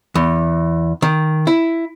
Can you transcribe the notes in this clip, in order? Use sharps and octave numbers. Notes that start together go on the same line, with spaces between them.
E2
D#3
E4